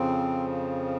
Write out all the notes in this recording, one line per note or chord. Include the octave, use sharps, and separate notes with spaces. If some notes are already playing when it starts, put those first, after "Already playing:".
Already playing: F2 C#3 F3 C4